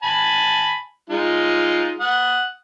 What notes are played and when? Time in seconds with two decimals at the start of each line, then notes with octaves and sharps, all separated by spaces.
0.03 G#5 A5 B5
1.10 G#3 D#4 F4
2.00 F#5 D#6